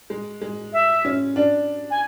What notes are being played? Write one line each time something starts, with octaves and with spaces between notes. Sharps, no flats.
G#3
G#3
E5
C#4
D4
G#5